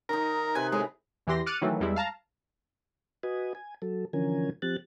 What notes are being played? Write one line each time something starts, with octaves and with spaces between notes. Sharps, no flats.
D#3 D#4 A#4
C3 B4 G#5
A2 G#3 G#4 A#5
E2 E3 G4 C6 A#6
D6 F6 F#6 A6 C#7 D#7
D#3 E3 F#3 A3
E2 G3 G#3 E4
F5 A5 A#5
F#4 B4 D#5 G#5
G#5
F#3 A4
D3 E3 F3 C#4 A#4 G#5
F3 C4 G4 F#6 A6